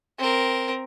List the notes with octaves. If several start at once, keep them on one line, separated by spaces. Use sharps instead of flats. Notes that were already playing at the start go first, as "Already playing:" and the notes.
C4 A#4